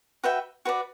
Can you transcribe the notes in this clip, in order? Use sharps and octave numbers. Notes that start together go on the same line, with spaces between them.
F#4 B4 E5 G5
F#4 B4 D5